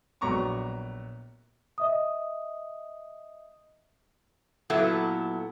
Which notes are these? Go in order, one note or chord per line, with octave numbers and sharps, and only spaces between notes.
A#1 F#3 B3 A#5 C#6 D6
D#5 E5 D#6
A#2 F#3 B3 E4 A4